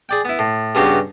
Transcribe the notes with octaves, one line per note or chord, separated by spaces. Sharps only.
G#4 D5 G5
B3 E4
A2
G2 C#3 B3 F#4 G4 C6